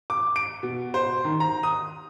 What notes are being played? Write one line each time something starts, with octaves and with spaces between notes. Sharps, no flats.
D6
D7
B2
C5
D#3
A#5
D#6